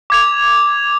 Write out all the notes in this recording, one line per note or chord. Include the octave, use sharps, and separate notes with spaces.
D6 G#6 F7